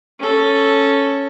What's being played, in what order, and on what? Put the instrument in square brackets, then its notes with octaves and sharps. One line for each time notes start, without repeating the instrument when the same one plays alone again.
[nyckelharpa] C#4 A4